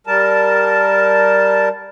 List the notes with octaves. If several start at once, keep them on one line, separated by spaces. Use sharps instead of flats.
G3 A#4 A5